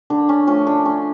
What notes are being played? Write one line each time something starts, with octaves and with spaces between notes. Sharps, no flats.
D3 D4
C#4
F3 A3 C#4
D4
D3 C#4